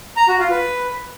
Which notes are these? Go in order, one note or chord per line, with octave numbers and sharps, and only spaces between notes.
A#5
F#4
F4
B4